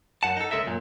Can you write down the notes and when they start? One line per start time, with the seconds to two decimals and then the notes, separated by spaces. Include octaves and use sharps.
0.23 F#2 F#5 A5
0.37 D#4 A4
0.51 C#2 G#3 A4 A#4 E5
0.67 F#2 A#2